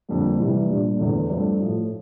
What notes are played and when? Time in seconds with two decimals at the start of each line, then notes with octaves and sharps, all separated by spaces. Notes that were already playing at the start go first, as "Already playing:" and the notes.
0.08 F2 D3 G3 A#3
0.39 C3 E3 G3
0.69 A#2 G3 D4
0.99 E2 D3 A3
1.30 G2 F3 A3 C4
1.60 A2 F3 A3